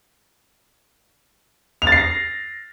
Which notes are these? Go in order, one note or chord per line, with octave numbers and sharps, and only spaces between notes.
F7
A6
C7
A#6